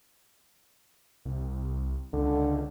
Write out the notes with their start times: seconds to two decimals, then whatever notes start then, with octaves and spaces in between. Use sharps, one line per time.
1.25 C2
2.13 C#2 D3